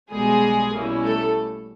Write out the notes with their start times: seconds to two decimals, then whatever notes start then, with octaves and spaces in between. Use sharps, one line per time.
0.10 B1 B2 G3 G#3 G#4
0.72 B2 G3 A#3 C#4 E4
1.02 A3 A4